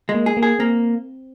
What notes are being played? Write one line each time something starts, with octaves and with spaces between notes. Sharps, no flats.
G#3
A#3
G#4
A#3
G#4
A#3 C4